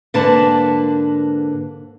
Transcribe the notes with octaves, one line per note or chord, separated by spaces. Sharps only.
G#2 D3 A#3 B4 A5